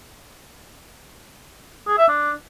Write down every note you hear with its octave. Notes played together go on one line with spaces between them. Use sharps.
G#4
E5
D4